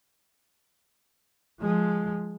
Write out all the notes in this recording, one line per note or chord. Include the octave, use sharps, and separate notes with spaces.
F3 G#3